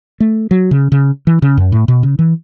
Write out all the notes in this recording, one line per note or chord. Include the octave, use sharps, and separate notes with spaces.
A3
F#3
C#3
C#3
E3
C#3
F#2
A2
B2
C#3
E3